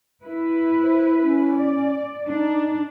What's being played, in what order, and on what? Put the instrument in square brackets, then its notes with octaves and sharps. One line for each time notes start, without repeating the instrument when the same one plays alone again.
[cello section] E4 B4
[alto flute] C5
C#4
[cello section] D5
[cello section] D4 [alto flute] D#4